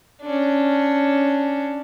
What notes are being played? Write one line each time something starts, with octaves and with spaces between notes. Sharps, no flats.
C#4 D4